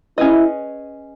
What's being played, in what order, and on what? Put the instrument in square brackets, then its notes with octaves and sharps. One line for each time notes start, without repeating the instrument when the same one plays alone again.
[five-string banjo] C#4 G#4 B4 D#5 [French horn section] E4